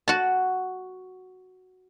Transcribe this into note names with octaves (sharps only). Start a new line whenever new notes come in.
F#4 A5